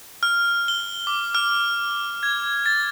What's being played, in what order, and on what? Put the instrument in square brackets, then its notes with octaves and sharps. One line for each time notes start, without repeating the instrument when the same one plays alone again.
[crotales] F6
G7
D6
F6
G#6
A6